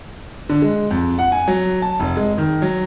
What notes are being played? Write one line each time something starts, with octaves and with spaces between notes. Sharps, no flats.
D3
G#3
F2
F#5
G#5
F#3
A5
F1
G#3
D#3
F#3